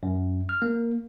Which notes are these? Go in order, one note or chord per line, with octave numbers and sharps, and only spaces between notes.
F#2
F6
A#3